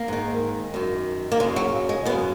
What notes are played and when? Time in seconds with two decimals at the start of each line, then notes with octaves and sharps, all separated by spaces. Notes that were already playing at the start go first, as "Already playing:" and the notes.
Already playing: A#3
0.08 G#2 D#3
0.74 F#2 D#3
1.32 A#3
1.40 C#3 G#3
1.43 F#2
1.56 F#3
1.89 G#3
2.05 F#2 B3
2.09 C#3